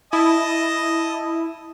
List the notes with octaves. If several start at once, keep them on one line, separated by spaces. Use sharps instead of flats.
E4 D#5 A5 D#6